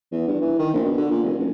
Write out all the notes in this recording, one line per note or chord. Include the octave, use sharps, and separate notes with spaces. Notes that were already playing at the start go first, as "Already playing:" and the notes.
E2
G2
E3
D#3
A#1
B2
D3
A#2
F1
F#1